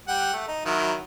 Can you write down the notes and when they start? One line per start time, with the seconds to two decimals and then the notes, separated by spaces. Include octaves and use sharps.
0.08 G3 F#5 G5
0.33 A3
0.48 D#4
0.65 D#3 F#3 E4